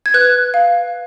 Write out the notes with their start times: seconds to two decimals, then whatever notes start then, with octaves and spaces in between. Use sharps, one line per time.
0.06 G#6
0.14 B4 F#6
0.54 F5